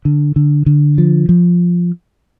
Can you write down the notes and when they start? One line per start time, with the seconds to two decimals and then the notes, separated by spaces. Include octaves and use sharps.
0.05 D3
0.36 D3
0.66 D3
0.98 F3
1.29 F3